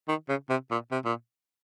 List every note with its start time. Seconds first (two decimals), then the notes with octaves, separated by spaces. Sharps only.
0.08 D#3
0.28 C#3
0.49 C3
0.71 A#2
0.91 C3
1.05 A#2